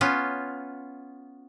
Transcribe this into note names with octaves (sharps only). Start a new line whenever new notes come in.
B3 C#4 F4